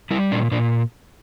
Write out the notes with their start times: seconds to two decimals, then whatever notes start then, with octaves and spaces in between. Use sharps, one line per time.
0.11 G3 E4
0.32 A#2 D4
0.51 A#2 D4